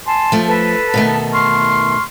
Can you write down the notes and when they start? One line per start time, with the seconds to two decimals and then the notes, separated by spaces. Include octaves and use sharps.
0.06 G#5 A5 C6
0.32 F3 A3
0.47 A4 B4 A5
0.94 B2 D#3 A3
1.31 C6 C#6 F6